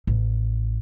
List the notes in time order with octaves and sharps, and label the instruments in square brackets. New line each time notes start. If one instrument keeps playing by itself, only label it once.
[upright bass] A1